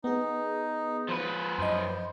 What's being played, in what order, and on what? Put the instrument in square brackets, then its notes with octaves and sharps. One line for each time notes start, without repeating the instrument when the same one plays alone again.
[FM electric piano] B3 G#4 [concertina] D#4
[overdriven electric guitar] F3 B4
[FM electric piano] F#2 D#5 [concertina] C5